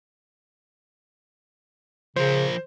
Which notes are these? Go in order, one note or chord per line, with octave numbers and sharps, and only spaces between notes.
C#3 F3 A#4 C5